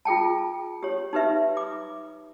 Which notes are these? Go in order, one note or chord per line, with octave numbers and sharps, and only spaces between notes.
F4 G#4 G5 A5
G4 C#5
D#4 G4 B4 E5
D6